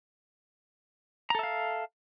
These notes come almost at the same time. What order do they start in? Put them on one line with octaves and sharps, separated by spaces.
A#5 A4 E5 F5